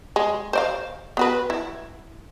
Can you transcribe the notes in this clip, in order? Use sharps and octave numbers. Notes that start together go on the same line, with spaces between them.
G#3
C5 D5 F5
B3 F#4 B4
E4